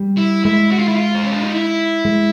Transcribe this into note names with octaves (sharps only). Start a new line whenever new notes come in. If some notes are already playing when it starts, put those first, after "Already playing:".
Already playing: G3
E4
G#3 E4
F#4
F4
E4
F4
C4
C#4
D4
D#4
E4
G#3